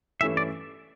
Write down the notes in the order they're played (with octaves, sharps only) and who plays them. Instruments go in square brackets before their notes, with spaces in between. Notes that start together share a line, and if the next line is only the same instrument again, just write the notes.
[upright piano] G2 E3 A3 C#4 E4 [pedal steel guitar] E5
[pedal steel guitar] D5